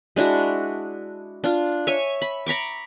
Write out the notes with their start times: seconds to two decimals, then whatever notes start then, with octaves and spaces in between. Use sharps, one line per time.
0.16 G#3 D4 E4 F#4
1.44 D4 F4
1.87 C#5 E5 G#5 C#6
2.22 B5
2.46 A#5 B5 C#6 D6